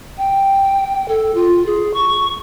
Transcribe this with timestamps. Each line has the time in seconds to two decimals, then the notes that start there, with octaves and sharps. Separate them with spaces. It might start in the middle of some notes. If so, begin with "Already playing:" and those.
0.18 G5
1.08 A4
1.35 F4
1.66 G#4
1.94 C#6